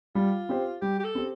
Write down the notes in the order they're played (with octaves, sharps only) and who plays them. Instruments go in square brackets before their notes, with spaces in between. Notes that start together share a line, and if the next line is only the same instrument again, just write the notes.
[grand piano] G3 [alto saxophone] F4
[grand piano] C4 G4 C5
[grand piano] G3 [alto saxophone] G4
[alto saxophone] G4
A4
[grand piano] C4 G4 C5